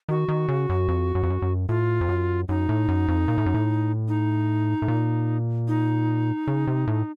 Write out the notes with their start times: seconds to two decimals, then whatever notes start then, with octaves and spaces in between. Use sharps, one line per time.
0.09 D#3 F#4
0.28 D#3
0.48 C#3
0.69 F#2
0.88 F2
1.15 F#2
1.23 F2
1.30 F#2
1.42 F#2
1.69 A2 F4
2.01 F2
2.09 F#2
2.48 F#2 D#4
2.69 A2
2.88 F#2
3.08 F2
3.28 A#2
3.38 A2
3.46 F#2
3.54 A2
4.08 D#4
4.82 A2
4.88 A#2
5.68 D#4
6.47 C#3
6.67 C3
6.87 A2